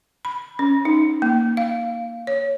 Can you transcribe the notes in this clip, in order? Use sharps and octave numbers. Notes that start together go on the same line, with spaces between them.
B5
C#4
D#4
A#3
F5
C#5